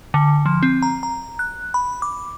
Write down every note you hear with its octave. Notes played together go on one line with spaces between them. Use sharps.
D3
F3
C4
A#5
A#5
F#6
B5
D6